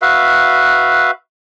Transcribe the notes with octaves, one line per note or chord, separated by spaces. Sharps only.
F#4 B4 E5 F5